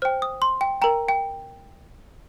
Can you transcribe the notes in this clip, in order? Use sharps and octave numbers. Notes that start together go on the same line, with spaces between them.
C5 G5 F6
D#6
C6
G5
A#4 G5 A#5
G5